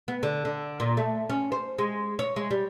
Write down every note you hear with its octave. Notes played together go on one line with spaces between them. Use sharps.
B3
D3
D3
A#2
A3
C#4
C5
G#3
C#5
G#3
G3